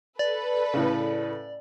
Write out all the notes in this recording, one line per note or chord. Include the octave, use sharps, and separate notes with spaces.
A4 B4 D5
A2 C#3